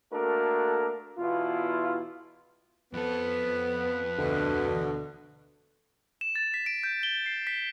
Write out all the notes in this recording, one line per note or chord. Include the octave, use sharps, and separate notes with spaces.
A3 A#3 D4 F#4 A4 A#4
E2 B2 E4 F4
F2 B3 A4 B4
D2 B2 D3
E7
A6
B6
D7
G6
G7
C7
B6